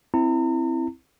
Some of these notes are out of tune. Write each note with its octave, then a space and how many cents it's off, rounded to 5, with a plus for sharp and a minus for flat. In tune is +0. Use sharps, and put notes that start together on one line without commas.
C4 +0 E4 +0 A#5 -40